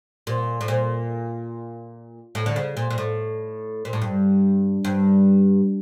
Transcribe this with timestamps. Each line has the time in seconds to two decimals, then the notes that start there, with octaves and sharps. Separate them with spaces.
0.27 A#2
0.61 A2
0.68 A#2
2.35 A2
2.46 D3
2.56 C#3
2.77 A#2
2.90 A#2
2.98 A2
3.85 A#2
3.93 A2
4.01 G2
4.85 G2